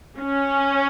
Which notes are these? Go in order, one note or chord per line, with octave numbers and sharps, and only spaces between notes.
C#4